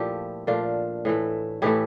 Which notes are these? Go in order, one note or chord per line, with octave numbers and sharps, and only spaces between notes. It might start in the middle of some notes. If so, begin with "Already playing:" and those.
Already playing: A#2 F3 A3 E4 G4
A#2 F3 A3 D4 F4
A2 E3 A3
A2 E3 A3 E4 G4